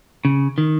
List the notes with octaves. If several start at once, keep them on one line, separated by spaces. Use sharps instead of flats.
C#3
D#3